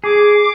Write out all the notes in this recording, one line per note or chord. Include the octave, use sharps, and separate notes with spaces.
G#4 D6